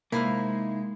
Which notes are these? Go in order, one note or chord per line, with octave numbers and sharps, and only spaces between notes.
C3 G#3 A#3 D#4 E4 C5 F5